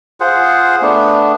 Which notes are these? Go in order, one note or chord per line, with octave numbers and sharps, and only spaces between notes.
F4 G#4 C5 F#5
A3 B3 D4